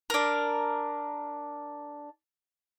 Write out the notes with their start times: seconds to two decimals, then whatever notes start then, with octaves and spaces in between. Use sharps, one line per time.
0.10 D4 A#4